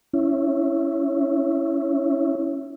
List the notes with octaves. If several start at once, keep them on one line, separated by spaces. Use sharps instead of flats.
C#4 E4